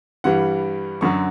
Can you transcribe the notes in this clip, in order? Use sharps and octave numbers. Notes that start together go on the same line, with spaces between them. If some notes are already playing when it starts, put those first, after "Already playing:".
G2 E3 G3 F#5
F#2 D3 F#3 C#6